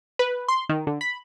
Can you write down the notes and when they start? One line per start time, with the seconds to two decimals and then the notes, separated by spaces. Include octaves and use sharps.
0.19 B4
0.48 C6
0.69 D#3
0.87 D3
1.01 B5